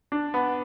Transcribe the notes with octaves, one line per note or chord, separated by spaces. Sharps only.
D4
B3